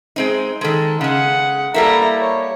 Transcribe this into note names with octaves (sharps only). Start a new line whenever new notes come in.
G#3 C4 D#4
D#3 G#3 A4
C#3 G#3 F#5
G3 A#3 E4 A4 A#5
C#5